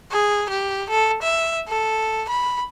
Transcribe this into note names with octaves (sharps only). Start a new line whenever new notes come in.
G#4
G4
A4
E5
A4
B5